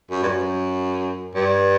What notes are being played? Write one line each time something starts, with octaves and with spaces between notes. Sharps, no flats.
F#2
G2
F#2
G2